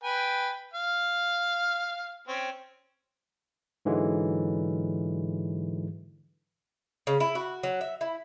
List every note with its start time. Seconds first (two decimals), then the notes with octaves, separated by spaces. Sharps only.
0.03 B4 G5 G#5
0.74 F5
2.28 C4 C#4
3.85 G#2 D3 E3 F#3 G#3
7.07 C#3
7.20 E4
7.35 F#4
7.63 F#3
7.81 E5
8.01 E4